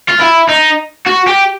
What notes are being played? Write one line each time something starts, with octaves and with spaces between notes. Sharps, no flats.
F4
E4
D#4
F#4
G4